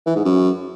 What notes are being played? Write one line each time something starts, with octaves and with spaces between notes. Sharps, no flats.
E3
G#2
F#2